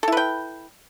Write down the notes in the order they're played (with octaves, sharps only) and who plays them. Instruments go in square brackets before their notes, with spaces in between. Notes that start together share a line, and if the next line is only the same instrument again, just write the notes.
[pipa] A4
E4
B4
G5